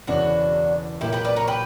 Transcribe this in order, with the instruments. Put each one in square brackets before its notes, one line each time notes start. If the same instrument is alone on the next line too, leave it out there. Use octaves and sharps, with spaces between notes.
[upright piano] E1 E2 C#3 E3 B3 [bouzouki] D4 F#4
[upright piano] B1 A#2 A#3 [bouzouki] E4 G4
[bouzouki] G4 B4
B4 D5
A#4 C#5
G4 B4